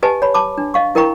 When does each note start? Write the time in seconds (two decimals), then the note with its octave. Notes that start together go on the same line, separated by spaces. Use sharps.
0.03 G4 B4 D#5 G#5 A5
0.22 C#5 B5
0.34 A5 B5 D6
0.58 D4
0.74 D#5 F5 C#6
0.95 E4 A#4 D#5 G5 A#5 C#6